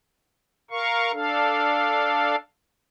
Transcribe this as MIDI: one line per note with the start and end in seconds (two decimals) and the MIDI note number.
0.71 1.12 70
0.71 1.12 77
0.71 1.12 85
1.13 2.36 62
1.13 2.36 69
1.13 2.36 77